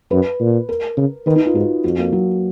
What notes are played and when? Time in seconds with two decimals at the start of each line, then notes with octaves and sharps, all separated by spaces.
0.11 F#2 B4
0.40 A#2
0.69 A#4
0.97 C#3
1.26 D#3 B4
1.36 D#4
1.46 F4
1.54 G#2 F#4
1.84 F2 F#4
1.98 A#3
2.12 F#3